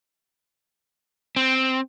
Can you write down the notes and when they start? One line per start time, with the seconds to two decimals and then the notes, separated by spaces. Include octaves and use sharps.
1.36 C4